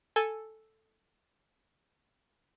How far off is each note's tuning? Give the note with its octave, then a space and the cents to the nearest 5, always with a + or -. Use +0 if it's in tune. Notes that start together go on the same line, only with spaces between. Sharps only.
A4 +0 G#5 +0